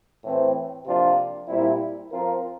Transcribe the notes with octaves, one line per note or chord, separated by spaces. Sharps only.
A2 E3 A3 C4
C3 F3 A#3 D4 F4
A#2 G3 C4 E4
F3 C4 F4 A#4